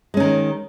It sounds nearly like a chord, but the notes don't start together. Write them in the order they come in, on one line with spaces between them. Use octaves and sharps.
G#3 C#4 D#3